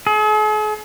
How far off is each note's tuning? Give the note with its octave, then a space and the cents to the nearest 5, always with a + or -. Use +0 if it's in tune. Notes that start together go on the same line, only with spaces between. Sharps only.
G#4 +45